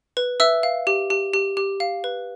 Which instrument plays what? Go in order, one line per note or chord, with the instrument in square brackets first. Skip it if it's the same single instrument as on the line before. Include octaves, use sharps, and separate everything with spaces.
[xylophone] B4
B4 E5 E6
F5
G4
G4
G4
G4
F5
B4